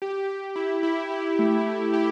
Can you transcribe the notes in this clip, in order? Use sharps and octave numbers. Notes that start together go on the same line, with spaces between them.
G4
G4
E4
E4
G4
A3
A3
G4